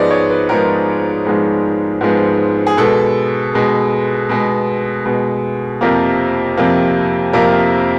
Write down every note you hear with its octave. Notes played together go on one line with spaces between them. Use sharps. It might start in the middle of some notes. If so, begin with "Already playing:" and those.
Already playing: G#2 F3 G#3 B3 D5 D#5
C#5
B4
G#2 F3 G#3 B3 A#4
G#2 F3 G#3 B3
G#2 F3 G#3 B3
G#4
B2 G#3 B3 A4
B2 G#3 B3
B2 G#3 B3
B2 G#3 B3
F2 C3 F3 A#3 A#4
F2 C3 F3 A#3
F2 C3 F3 A#3 A#4